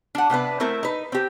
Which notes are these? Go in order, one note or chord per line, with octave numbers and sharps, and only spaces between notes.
D4 F#5
C3 B3 D4 B4
A3 C4 E4 A#4
D#4 B4
C4 G4